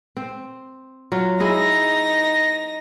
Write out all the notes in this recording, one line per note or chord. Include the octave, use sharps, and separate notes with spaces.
C4
F#3 F4
D#4 E4 G#4 D#5 A#6